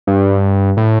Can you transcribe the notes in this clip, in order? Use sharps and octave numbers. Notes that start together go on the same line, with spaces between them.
G2
A2